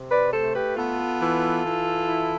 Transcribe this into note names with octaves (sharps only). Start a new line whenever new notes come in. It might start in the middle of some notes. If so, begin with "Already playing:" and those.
Already playing: C3
B4 D5
A3 A4 C5
G4 B4
B3 F4 A4
E3
E3
E4